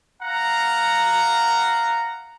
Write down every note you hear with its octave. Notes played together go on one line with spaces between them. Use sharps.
F5 F#5 A#5